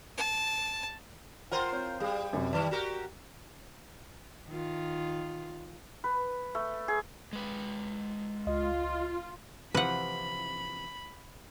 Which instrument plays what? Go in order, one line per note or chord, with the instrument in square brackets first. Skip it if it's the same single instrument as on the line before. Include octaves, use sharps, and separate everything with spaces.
[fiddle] A5
[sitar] F4 A#4 C5 [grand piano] F#5 G5 C6
[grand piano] C4 C#5 G6
[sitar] G3 [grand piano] G#4 F5
[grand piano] F#2 C3
[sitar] D#3 G3 [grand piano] D5
[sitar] F#4 G4 A#4
[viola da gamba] D#3 F4
[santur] B4
A3
G#4
[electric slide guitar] G#3 B4
[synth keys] C#2 D#5 [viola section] F4
[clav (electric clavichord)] C3 E3 F3 [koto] B4 F#5 [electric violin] B5